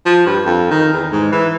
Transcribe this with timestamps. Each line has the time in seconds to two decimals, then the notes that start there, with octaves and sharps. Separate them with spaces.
0.05 F3
0.26 G2
0.45 F2
0.71 D#3
0.93 E2
1.12 G#2
1.32 E3